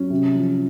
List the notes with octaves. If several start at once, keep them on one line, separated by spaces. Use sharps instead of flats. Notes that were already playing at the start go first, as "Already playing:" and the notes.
Already playing: F#3 C#4
C3
F3